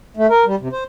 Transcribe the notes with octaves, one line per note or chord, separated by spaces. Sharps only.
A3
A#4
G3
C3
C5